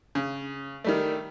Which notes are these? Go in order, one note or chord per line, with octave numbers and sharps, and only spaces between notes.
C#3
D#3 G3 A3